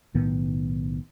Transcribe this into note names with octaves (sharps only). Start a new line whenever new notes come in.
B1 A2 D#3 B3